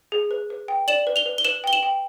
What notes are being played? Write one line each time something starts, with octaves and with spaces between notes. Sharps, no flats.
G#4
B4
B4
G5
D5 E7 F#7
B4
F7 G7
B4
G7
B4 E7 F#7
G5 G7
E7 F#7
G5